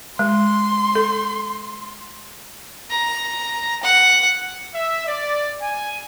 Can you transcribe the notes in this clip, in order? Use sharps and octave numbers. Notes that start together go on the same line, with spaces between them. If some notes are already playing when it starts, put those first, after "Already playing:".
G#3 C6
A4
A#5
F#5
E5
D5
G#5